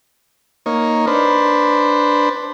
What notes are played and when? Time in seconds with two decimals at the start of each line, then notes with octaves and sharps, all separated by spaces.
0.66 A#3 D#4 C#5
1.07 D4 B4 C5